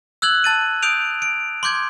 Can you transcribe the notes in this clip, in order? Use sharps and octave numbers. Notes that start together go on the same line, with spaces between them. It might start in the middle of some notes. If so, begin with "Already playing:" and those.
E6 F#6 G#6 F#7
A5 A6 D#7
D#6 G6 D7 F7
D7
C6 D6 G6 G#6